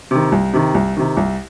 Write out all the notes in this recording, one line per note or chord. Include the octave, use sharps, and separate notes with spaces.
C3 D#3
C2
C3 D#3
C2
C3 D#3
C2